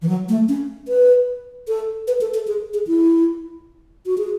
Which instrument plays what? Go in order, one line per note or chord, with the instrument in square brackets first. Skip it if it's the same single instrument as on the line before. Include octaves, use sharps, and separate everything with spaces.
[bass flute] E3
F#3
A3
C#4
B4
A4
B4
A4
A4
G#4
G#4
E4
F#4
G#4